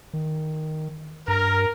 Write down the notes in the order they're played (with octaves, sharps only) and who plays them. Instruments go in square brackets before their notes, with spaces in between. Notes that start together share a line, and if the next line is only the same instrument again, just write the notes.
[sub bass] D#3
[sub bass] G2 [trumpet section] A#4